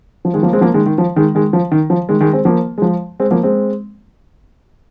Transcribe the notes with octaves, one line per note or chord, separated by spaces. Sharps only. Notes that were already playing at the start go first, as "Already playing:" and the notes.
F3
D#3 G#3
F3 A#3
G#3 C4
F3 A#3
D#3 G#3
D#3
F3
D#3 G#3
D#3 G#3
F3
D#3
F3
D#3 G#3
D#3 G#3
G#3 C4
F3 A#3
G#3
F3
G#3 C4
F3 A#3
G#3 C4